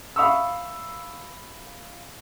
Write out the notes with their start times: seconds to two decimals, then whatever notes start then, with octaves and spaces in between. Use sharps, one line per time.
0.16 E5 F5 B5 C#6 D#6 E6